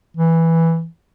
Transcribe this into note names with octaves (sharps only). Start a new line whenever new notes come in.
E3